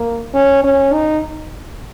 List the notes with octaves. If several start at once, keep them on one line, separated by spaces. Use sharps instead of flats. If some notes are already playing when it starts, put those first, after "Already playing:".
Already playing: A#3
C#4
C#4
D#4